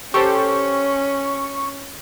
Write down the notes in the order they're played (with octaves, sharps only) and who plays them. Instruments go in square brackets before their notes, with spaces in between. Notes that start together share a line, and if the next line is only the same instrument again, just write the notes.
[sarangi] C#4 [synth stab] G4 A4 C5 [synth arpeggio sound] C#6